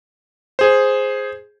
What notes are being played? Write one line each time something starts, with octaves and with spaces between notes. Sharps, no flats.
G#4 C5